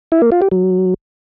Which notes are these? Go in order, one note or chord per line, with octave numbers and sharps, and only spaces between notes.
E4
A#3
F4
G4
F#3